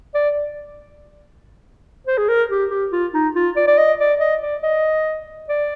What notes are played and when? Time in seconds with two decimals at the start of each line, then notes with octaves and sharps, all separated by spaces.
0.14 D5
2.07 C5
2.18 G#4
2.28 A#4
2.50 G4
2.70 G4
2.92 F4
3.14 D#4
3.35 F4
3.56 D5
3.67 D5
3.78 D#5
3.99 D5
4.20 D#5
4.42 D5
4.63 D#5
5.49 D5